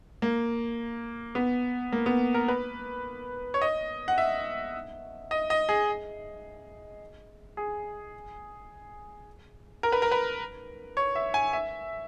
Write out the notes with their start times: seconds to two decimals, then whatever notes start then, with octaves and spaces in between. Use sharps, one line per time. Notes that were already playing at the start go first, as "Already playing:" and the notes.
0.22 A#3
1.35 B3
1.92 A#3
2.06 B3
2.34 A#4
2.48 B4
3.54 C#5
3.61 D#5
4.08 F#5
4.18 E5
5.31 D#5
5.50 D#5
5.69 G#4
7.57 G#4
9.83 A#4
9.92 B4
10.02 A#4
10.11 B4
10.97 C#5
11.15 E5
11.34 G#5
11.53 E5